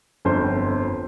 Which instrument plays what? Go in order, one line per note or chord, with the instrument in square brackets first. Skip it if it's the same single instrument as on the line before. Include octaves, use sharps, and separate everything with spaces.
[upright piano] G1 F2 C5 C6